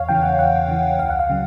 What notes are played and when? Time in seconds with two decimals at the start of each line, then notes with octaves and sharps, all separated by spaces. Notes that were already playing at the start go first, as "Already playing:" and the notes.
Already playing: E2 C#5 F5
0.09 C#3 E3 G5
0.23 F#5
0.39 E2 F#5
0.68 C#3 E3
0.99 C#2 F5
1.10 F#5
1.19 F5
1.29 C#3 F#3